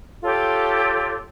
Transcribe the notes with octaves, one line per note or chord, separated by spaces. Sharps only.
F4 G4 A4 C#5